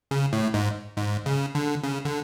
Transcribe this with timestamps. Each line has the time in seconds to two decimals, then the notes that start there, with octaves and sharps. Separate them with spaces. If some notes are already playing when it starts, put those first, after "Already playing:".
0.11 C#3
0.33 A2
0.54 G#2
0.97 G#2
1.26 C#3
1.55 D3
1.84 C#3
2.05 D3